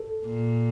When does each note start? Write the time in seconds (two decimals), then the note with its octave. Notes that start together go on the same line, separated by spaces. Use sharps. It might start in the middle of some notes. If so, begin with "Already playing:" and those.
Already playing: A4
0.26 A#2